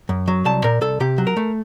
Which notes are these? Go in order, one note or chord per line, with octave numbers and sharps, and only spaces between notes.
F#2
F#3
C2 A5
A#2 A#4
C2 A4
C3 G4
F#3
A#4
A3